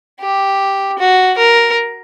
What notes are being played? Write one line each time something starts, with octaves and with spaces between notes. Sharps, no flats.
G4
F#4
A#4